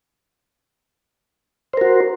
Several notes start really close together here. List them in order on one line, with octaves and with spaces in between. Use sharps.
C5 A#4 F#4